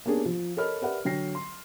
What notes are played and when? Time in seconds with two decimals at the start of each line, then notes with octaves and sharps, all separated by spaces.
0.06 A#3 B3 C#4 D4 G4 G#4
0.25 F3
0.57 A4 A#4 C#5 D#5 B5 F6
0.82 G4 A#4 B4 D5 E5 F#5
1.05 D3 F#3 G5 A#6 C7
1.35 C6